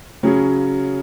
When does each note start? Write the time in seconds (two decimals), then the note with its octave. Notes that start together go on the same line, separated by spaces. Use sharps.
0.23 C#3 F#3 C#4 G#4